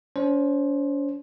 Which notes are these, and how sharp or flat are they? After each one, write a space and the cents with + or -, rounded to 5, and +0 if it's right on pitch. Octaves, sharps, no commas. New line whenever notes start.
C#4 +45 C5 +15